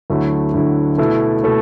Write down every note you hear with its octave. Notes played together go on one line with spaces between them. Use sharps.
D2 D3 F#3 A3 E4
D2 D3 F#3 A3 E4
B2 A3 E4 A4
B2 A3 E4 A4